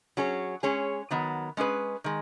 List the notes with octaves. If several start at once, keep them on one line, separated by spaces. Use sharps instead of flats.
F#3 C#4 G#4 C#5
G#3 C#4 G#4 C#5
D#3 F#3 B3
G#3 C#4 G#4 B4
D#3 G#3